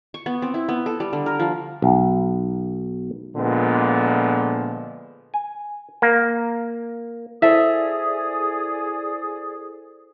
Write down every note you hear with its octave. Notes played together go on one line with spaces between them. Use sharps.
C#6
B3
C4
E4
B3
A4
G3
D3
A#4
F3
B1
A#2 D3 F3 G#3 B3
G#5
A#3
E4 G#4 A4 C5 D5 E5 D#6